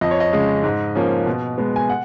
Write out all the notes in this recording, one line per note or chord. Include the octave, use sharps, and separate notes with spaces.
F2 D#5
C#5
D#5
C#3 G#3
G#2
F3 A#3 C#4
B2
G#3 B3
G#5
F#5